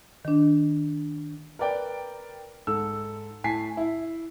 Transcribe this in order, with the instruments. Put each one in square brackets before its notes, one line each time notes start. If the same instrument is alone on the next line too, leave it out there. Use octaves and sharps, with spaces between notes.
[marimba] D#3 D4
[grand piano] A#4 B4 D5 G5
G#2 A4 E6
A2 G#5 A5 B6 C7
E4